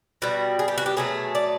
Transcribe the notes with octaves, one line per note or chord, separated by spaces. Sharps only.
B2 G3 F#4
G#4
G4
F#4
G4
B2 F#3 A3 G#4
D5